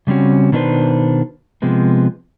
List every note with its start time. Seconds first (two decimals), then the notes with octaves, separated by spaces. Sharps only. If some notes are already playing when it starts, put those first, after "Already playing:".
0.07 C#3 G3 C4 C#4 F#4
0.52 B2 D#3 A#3 D4 B4 C5
1.62 C3 F3 G#3 B3